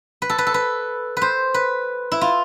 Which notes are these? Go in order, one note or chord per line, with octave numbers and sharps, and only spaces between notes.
B4
A4
B4
A4
B4
B4 C5
B4
E4
F4